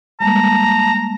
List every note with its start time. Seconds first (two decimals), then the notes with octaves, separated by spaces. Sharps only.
0.20 G3 G#3 A#3 A5 A#5